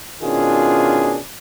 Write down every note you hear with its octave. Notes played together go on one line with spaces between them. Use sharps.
B2 D#3 C#4 D4 F4 G#4